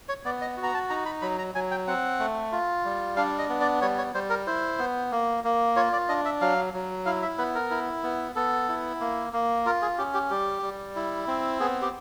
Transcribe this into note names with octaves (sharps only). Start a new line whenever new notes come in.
C#5
B3 D5
D#5
F#4
A#5
A5
D#4 A#5
B5
F#3 B5
A#5
F#3 G#5
G5
C4 F#5
A3
F4
G3
D4 F5
D#5
B3
D5
G3 C#5
C#5
G3 C5
A#4
E4 C5
B3
A#3
A#3
F4 C#5
D5
D4 D#5
E5
F#3 F5
F#3
E4 F5
E5
B3 B4
A#4
E4
B3
B3 A4
E4
A#3
A#3
F4 A#4
G#4
C#4 G4
G4
G3 G4
G3
E4
C4
B3 G#4
G4